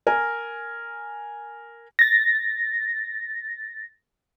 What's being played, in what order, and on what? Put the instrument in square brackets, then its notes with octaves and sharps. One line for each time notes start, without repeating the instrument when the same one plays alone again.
[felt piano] A#4 G#5
[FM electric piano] A6 A#6